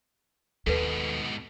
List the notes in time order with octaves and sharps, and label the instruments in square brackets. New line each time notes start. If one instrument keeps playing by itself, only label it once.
[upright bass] D#2 [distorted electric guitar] G#2 B2 [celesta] A4 B4